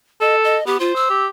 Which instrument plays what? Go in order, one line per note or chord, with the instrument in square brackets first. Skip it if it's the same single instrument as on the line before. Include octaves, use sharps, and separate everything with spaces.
[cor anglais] A4 [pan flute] D#5
[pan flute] D#5
[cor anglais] B3 [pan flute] G4
[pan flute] F4 [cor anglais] C5
[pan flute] E6
[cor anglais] G4